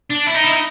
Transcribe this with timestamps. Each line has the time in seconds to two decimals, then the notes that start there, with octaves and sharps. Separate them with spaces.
0.10 D4
0.27 E4
0.34 D#4
0.44 E4
0.51 D#4